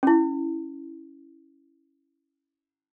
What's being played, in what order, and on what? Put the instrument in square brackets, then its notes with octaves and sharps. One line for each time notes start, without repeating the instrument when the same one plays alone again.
[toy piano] C#4 E4